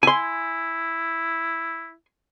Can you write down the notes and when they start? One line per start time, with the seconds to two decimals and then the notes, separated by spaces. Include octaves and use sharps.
0.03 E4 G#5 C6